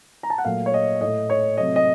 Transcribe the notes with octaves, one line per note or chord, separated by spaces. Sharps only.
A#5
A5
F#5
A#2 F#3 A3 F5
C#5
D#5
A2 D#5
A3
C#5
C3 F#3 A3 D#5
D#5